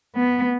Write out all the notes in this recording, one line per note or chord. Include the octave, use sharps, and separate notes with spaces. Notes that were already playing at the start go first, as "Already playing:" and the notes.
B3